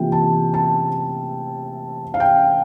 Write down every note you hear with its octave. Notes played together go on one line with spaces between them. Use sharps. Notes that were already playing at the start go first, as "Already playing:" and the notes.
Already playing: C3 E3 A#3 F4 G5
A5
A5
F5
G5